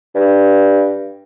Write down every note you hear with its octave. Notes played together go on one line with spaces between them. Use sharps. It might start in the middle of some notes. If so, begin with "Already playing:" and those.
G2